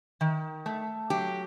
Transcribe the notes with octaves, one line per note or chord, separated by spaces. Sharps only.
D#3
A3
F#3 G4